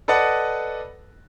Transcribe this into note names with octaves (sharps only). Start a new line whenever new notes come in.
A4 B4 D5 D#5 F#5